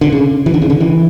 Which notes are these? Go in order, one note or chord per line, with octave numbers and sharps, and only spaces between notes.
D3
C#3
E3
D3
C#3
D3
E3